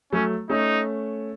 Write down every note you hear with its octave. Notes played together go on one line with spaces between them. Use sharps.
F#3 A3 C#4
A3 C#4 D#4